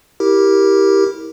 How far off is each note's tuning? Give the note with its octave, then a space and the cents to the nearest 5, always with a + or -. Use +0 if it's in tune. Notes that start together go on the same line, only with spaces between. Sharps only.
E4 -20 G4 +0 A#4 +0